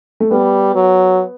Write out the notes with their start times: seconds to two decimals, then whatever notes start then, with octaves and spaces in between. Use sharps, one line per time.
0.20 A3
0.31 G3 B3
0.75 F#3